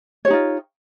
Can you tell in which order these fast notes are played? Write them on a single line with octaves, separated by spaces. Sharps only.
C#5 G4 D#4 F4